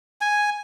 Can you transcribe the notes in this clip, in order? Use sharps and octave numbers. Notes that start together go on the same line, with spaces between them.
G#5